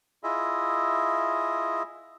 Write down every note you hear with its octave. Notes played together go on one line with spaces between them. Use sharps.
E4 F4 G#4 D#5 E5